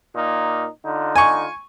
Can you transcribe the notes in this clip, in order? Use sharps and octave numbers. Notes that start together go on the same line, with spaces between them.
A#2 A#3 D#4
D3 D#4 F4
G#5 C#6